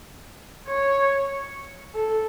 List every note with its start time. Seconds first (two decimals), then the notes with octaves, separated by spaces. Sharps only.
0.68 C#5
1.94 A4